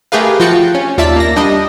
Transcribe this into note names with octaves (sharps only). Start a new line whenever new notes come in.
A3 G4 G#4 A#4 B4 F5
F3 F4 F#4 G5 A6 C#7
C#4
D#2 F4 D5 E5 A5 B6
A#3 A#6
G3 D4 D#5